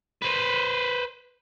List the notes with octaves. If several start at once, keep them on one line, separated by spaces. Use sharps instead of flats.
B4 C5